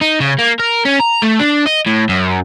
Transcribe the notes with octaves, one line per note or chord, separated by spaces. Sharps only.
D#4
C#3
A#3
A#4
C#4
A#5
A3
D4
D#5
A2
F#2